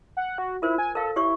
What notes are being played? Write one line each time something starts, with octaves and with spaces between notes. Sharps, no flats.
F#5
F#4
E4 F4 A#4 C5
G#5
A4 A#4 F5
E4 G4 C#5 C#6